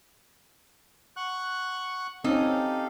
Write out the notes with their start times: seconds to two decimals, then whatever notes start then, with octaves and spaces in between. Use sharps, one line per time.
1.16 F#5 C#6 F#6
2.24 C4 C#4 D#4 G4 A4 F5